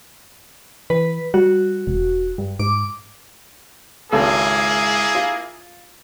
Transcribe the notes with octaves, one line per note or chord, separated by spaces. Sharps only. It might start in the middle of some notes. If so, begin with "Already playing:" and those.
E3 B4
G3 F#4
E1
G2
G#2 D6
G#1 C#2 A#3 E4 G#4 A4
F4